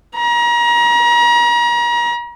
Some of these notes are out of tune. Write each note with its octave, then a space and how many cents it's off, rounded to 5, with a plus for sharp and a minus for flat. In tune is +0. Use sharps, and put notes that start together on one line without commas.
A#5 +35